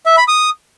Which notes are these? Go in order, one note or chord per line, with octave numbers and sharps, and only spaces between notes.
E5
B5
D#6